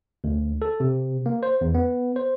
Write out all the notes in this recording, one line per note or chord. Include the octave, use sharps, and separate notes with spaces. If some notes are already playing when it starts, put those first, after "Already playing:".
D2
A4
C3
A#3
C5
E2
B3
C5